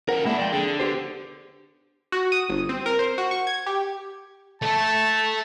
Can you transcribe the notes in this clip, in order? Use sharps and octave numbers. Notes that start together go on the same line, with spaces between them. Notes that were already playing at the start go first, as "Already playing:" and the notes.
C#3 A#4 F#5
G#3 A#3 D4 E4
F2 D5 G5
D3 G#4
B3 G4 C5
F#4
D#6
G1
C4
A#4
C5
F#4
C#6
G#6
G4
A3 A4 A5